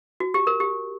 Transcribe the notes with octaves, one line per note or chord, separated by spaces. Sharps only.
F#4
G4
A#4
G4